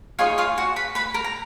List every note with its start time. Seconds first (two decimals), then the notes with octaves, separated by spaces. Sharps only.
0.19 D#4 F4 G#4 C#5 F5
0.38 F4 F5
0.58 F#4 F#5
0.76 B4 B5
0.95 B4 B5
1.14 A#4 A#5
1.24 A#5